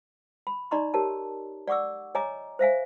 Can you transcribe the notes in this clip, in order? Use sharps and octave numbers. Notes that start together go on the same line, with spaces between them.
B5
D#4 D5 D#5 A#5 C6 C#6
G4 A#4 C#5 A5
D5 F#5 C#6 D6 E6
C#5 D#5 G#5 A#5 D6
C5 E5 F5 G#5